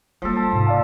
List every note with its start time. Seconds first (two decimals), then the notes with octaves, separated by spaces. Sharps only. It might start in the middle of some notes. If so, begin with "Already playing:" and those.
0.22 F3 G3 A#3 A4
0.37 A5
0.52 G#2 C3
0.67 D5 F5 A5